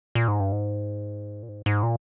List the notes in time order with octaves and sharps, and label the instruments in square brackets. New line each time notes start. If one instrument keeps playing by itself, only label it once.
[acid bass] A#2
G#2
G2
G#2
A#2
G#2
G#2
A#2